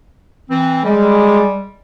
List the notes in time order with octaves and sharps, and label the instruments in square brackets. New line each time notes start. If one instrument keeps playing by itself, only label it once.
[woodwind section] E3 C4
[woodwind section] G3 [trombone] G#3